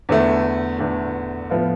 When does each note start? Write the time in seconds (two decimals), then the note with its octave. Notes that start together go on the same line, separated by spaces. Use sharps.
0.09 E2 D3 A3
0.79 E2 D3 A3
1.49 A2 F3 B3 F4